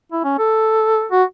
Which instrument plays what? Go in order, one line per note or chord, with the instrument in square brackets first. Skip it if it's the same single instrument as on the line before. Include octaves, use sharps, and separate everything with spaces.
[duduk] E4
C#4
A4
F#4